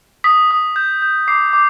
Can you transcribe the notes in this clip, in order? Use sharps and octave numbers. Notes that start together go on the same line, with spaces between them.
D#6 B6
D#6
G6
G6
D6 C7
D6